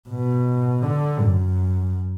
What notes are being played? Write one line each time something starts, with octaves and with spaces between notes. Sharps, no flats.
B2
D3
F#2